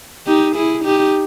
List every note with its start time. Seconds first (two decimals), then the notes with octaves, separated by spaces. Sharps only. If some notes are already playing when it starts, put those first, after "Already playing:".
0.27 D#4 G4
0.55 E4 G#4
0.84 D#4 G4